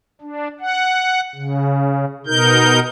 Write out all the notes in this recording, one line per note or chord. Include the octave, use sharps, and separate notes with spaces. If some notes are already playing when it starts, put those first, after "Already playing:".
D4
F#5
C#3
B2 D#4 A#4 G6